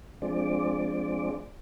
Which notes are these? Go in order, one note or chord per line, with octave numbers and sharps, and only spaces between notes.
F3 G#3 C4 D4 D5